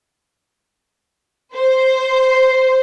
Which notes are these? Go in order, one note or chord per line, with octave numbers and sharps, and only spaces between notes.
C5